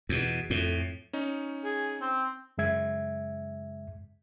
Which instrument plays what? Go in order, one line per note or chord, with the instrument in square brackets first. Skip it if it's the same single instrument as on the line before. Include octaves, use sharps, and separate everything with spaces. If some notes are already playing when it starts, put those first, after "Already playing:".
[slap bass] E2 B2
F2 A2
[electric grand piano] C#4 D#4
[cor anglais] G#4
C4
[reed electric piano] F#2 C#3 G#3 E5 G#6